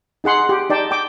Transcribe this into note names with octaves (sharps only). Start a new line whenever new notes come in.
D#4 G#4 F#5 C6
G4
D#4 D5 G5 A5
G5 D6